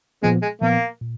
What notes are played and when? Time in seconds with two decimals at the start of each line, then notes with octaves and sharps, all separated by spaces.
0.23 A#2 F3 G#3 B3
0.42 G#3
0.61 A#2 F3 A#3 B3
1.01 A#2